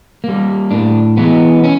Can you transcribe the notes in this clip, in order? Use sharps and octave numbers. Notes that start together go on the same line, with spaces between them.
G3 A#3
A2 D4
E3 G#3 B3
C#4